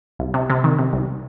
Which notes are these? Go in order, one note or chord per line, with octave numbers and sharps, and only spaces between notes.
C2
C3
C3
D#3
C3
C2